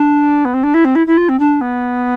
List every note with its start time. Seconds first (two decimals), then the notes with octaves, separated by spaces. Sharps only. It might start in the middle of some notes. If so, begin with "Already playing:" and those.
Already playing: D4
0.45 B3
0.54 C4
0.63 D4
0.74 E4
0.85 C4
0.95 E4
1.07 E4
1.17 F4
1.29 C4
1.39 D4
1.61 B3